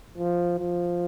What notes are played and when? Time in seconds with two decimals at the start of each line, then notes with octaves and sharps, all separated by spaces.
0.17 F3
0.59 F3